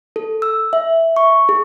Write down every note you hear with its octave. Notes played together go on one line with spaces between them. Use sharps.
A4
E6
E5
C#6
G#4